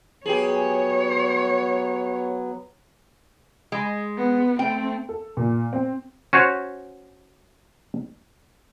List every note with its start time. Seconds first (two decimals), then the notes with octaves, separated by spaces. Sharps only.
0.26 F#3 B3 G4 G#4 C#5
3.72 G#3
4.18 B3
4.59 A3 C4 G5
5.09 A4
5.37 A#2
5.73 C4
6.33 C#4 F#4 C5 C#5